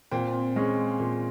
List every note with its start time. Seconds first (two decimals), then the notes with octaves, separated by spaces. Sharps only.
0.11 A#2 C4
0.56 G#3 C#4
1.00 A#2